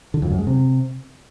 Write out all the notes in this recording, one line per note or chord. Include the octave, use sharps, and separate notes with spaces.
D3
F2
F#2
G#3
C3